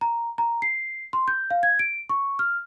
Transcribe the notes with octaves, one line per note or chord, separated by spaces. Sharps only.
A#5
A#5
C7
C6
G6
F5
G#6
D7
C#6
F6